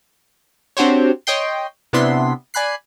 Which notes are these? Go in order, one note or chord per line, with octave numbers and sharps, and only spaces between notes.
C4 D4 F#4 G4 C5 C#5
C#5 D#5 G5 C6
C3 B3 D4 E4 C6 B6
D5 G#5 B5 F#6 C7